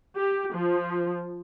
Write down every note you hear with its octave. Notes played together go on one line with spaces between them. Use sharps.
G4
F3